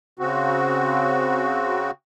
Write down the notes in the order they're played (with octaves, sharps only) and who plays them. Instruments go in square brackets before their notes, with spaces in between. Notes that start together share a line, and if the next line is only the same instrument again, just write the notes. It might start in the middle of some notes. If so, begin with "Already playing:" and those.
[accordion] C#3 C4 F#4